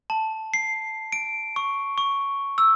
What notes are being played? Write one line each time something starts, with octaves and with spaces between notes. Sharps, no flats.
A5
C7
D7
C#6
C#6
E6